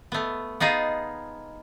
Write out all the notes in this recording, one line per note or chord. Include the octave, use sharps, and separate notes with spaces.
A3 B3
B3 D#4 F4 G#4